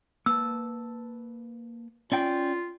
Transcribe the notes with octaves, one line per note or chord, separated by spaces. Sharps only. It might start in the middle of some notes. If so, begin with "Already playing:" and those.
A#3 B4 A5 E6
C#4 F4 D5 G5